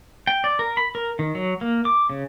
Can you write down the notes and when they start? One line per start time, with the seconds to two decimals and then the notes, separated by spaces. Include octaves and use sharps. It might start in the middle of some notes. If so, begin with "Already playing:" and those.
0.27 G5
0.44 D5
0.59 A#4
0.77 B5
0.95 A#4
1.19 D#3
1.35 F#3
1.61 A#3
1.85 D6
2.10 C#3